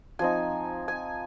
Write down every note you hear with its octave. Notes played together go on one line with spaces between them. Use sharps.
F3 C4 D#4 G#5
G#5